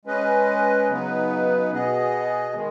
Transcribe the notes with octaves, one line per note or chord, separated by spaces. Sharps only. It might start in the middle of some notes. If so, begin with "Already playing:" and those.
G#3 C#4 B4 D#5
C#3 F#3 B3 D#4 B4
B2 B3 G#4 D#5
D#3 G#3